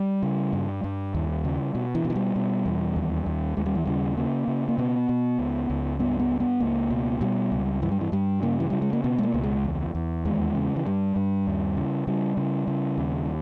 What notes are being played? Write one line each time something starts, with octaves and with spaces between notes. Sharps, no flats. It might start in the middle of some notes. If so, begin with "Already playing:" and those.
Already playing: G3
C#3
G2
G2
D#2
C#3
B2
E3
B2
E3
G3
B2
E2
D#2
D#2
D#2 G#3
G3
E3
C#3 G3
C#3 A#3
C#3
A#3
B2 B3
B2
C#2
C#2
G2 B3
B3
G2
B3
C#2 A#3
B2
B2 G3
C#2
G2 E3
G3
E3
G2 G3
C#3 A#3
E3
C#3 G3
G#3
A#3
B2 B3
G#3
A#3
C#2
G#3
E2
E2
D#2 G#3
C#3
E3
G2 G3
G2
D#2
C#3
C#3 G3
C#3
C#3
D#2